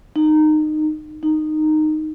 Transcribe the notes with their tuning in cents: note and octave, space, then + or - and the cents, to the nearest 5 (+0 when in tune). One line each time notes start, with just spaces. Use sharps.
D#4 -20
D#4 -15